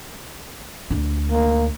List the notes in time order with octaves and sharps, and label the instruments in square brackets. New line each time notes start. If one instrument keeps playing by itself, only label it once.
[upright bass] D2 D4
[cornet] A#3